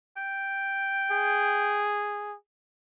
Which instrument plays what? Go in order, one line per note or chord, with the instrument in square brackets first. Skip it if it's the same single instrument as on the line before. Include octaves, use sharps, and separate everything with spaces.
[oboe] G5
[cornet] G#4